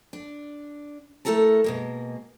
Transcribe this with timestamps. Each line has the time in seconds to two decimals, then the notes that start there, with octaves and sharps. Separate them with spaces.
0.13 D4
1.25 A3 E4 A4 A#4 A5
1.64 B2 G#3 A#3